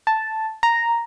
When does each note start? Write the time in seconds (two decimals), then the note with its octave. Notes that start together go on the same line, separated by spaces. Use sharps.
0.07 A5
0.63 A#5